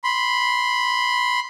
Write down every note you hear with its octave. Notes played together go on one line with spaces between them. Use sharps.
B5 C6